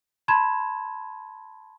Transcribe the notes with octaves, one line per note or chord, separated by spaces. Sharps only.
A5 B5 C6 G#6 E7